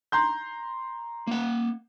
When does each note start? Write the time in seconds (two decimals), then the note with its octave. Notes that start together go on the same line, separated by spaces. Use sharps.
0.12 A#5 C6 G6
1.27 A#3 F#5